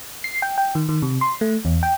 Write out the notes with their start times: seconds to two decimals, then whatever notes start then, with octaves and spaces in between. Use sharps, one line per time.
0.24 C7
0.42 G5
0.58 G5
0.75 D#3
0.89 D#3
1.02 C3
1.21 C6
1.41 A3
1.65 E2
1.83 G5